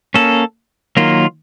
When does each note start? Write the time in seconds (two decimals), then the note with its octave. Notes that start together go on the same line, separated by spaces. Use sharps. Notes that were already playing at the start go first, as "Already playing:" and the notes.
0.14 A#3 C#4 A4
0.97 D#3 F#3 A#3 F4